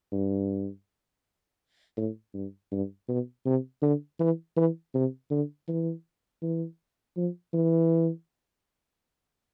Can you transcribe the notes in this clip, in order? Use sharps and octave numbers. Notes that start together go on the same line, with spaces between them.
G2
A2
G2
G2
B2
C3
D3
E3
E3
C3
D3
E3
E3
F3
E3